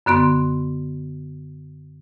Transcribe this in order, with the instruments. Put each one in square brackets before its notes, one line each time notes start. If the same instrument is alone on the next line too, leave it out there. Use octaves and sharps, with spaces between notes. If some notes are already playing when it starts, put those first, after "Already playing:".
[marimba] F#2 D3 B3 C6